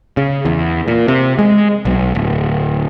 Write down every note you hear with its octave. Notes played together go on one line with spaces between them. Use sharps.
C#3
E2
A#2
C3
G#3
B1
D1